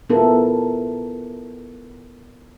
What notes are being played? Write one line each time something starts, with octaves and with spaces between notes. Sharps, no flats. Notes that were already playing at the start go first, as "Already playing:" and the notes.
B3 E4 F4 A4 A#4